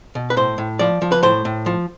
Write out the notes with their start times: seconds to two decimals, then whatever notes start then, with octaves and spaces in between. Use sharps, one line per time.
0.15 B2
0.30 B4
0.37 A2 C5
0.58 A2
0.79 F3 D5
1.02 F3
1.12 B4
1.23 A2 C5
1.45 A2
1.66 F3